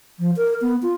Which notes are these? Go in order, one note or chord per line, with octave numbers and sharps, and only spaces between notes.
F3
A#4
B3
F4